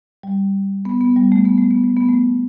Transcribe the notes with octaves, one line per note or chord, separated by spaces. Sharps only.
G3
B3
B3
G3
A3
B3
A3
B3
A3
B3
A3